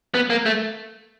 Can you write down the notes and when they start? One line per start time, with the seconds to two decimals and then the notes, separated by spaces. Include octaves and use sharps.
0.14 B3
0.30 A#3
0.46 A3